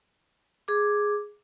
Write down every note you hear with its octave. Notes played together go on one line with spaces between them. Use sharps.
G#4 D6